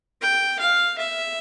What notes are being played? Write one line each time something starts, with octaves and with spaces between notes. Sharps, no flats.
G5
F5
E5